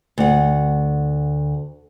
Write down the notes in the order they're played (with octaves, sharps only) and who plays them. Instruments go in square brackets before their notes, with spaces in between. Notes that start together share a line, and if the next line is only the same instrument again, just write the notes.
[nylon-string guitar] D2 F#5